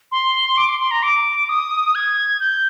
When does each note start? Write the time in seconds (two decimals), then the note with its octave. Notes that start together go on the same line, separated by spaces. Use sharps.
0.12 C6
0.57 D6
0.69 C6
0.81 C6
0.91 A#5
1.03 D6
1.49 D#6
1.95 G#6
2.40 G6